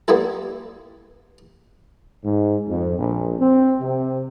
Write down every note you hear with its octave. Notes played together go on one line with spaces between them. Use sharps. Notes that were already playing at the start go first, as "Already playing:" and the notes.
G3 A#3 B3 E4 A4
G#2
F2
A#1
C4
C3